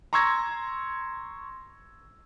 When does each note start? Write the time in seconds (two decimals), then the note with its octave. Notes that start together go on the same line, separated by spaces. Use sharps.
0.13 A#5 C6 C#6 E6 G#6 A#6